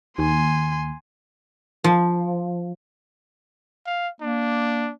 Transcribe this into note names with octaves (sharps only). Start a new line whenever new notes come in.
D#2 G#5 C6
F3
F5
A#3 D4